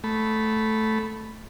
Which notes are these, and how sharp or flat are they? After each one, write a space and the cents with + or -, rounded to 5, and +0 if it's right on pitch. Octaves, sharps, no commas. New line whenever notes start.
A3 -5 B5 +0